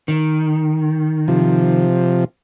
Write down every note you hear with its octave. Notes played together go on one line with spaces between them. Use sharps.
D#3
C3 F3